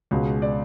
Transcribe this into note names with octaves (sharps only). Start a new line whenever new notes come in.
C#2 B2 G#3
D5